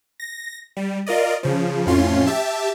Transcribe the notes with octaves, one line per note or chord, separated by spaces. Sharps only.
A#6
G3
F4 A#4 D5 D#5
C#3 F3
F2 A2 C#4 F4 C6
G4 E5 A5